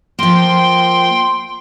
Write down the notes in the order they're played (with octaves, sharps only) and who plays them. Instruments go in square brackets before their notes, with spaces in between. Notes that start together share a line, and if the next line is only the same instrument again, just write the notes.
[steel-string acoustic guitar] F3 A#3 [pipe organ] G5 C6